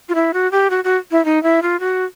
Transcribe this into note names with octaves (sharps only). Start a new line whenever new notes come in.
F4
E4
F#4
G4
F#4
F#4
E4
D#4
E4
F4
F#4